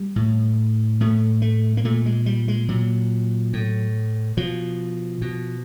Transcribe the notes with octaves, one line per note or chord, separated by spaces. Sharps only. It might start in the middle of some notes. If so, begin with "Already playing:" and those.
Already playing: G3
A2
A2 A3
A3
A#3
A#2 A3
G#3
G3
G#3
A#2 F#3
A2
B2 F3
B2